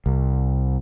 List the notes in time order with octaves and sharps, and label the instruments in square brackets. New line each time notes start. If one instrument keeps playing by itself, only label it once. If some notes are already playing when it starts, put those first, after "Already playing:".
[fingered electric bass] C2